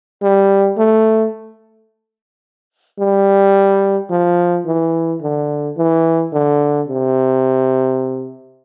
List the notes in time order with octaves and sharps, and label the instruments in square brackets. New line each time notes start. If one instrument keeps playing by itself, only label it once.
[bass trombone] G3
A3
G3
F3
E3
D3
E3
D3
C3